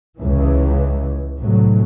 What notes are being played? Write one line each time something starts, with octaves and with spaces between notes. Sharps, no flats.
C#2 C#3 E3
C2 A2 F#3